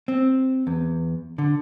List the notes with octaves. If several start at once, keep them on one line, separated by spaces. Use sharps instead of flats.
C4
E2
D3